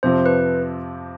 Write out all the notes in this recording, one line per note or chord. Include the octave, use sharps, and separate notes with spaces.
F2 C3 F3 C4 C5
B4